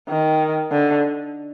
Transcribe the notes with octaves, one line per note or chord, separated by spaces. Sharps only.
D#3
D3